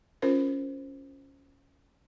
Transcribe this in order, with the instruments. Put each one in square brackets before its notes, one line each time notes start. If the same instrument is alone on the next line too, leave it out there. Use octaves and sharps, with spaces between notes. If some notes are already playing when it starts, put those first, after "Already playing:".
[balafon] C#4 F4 A#4 C5